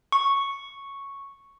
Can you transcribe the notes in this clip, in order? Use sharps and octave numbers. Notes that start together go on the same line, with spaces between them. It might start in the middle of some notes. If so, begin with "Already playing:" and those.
C#6